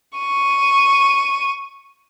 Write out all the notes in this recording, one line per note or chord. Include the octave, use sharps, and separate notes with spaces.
C#6 D#7